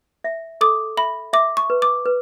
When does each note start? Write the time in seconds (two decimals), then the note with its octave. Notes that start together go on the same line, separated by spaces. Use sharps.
0.24 E5
0.61 A4 D6
0.97 E5 B5
1.33 E5 D6
1.57 C#6
1.70 B4
1.82 D6
2.06 B4